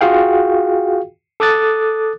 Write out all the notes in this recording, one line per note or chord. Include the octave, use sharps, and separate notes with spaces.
F4 F#4 G#4 F5 G5
A4 D6 D#6 F#6 A6